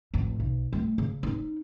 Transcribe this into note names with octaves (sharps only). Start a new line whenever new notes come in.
A1 F2
B1
G3 A3
C#3
C#4 D#4